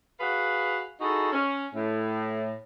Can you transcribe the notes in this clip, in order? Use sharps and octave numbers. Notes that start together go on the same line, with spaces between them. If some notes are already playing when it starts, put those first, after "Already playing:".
F#4 G#4 B4 F5 F#5
D#4 E4 F#4 G#4 A4
C#4
A2